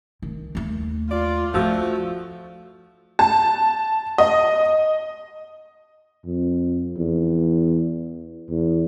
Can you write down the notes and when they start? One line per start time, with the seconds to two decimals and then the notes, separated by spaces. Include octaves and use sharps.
0.22 D#3
0.55 D#2 A3
1.11 F4 D5
1.54 F3 A3 D4 F#4 E6
3.19 A5
4.18 D#5
6.25 F2
6.97 E2
8.49 E2